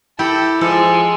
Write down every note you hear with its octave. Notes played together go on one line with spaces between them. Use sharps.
E4 G4 A4
F3 G#3 A4